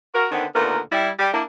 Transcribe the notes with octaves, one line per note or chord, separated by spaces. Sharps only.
F#4 A#4
D3 D#3 B3 C4
D#2 A#2 D3 A3 B3 A#4
G3 E4
G3 G4
A#3 D4 E4